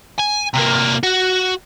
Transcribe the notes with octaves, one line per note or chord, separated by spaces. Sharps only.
G#5
C3 A#3
F#4